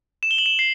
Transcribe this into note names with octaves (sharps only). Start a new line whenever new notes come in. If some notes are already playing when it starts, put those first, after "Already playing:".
E7
G7
F#7
E7
C7